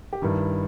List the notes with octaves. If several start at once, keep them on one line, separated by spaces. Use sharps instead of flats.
G4
G2 D#3 E4